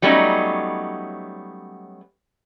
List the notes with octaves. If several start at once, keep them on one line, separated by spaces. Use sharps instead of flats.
F#3 G3 A3 B3 C#4 D#4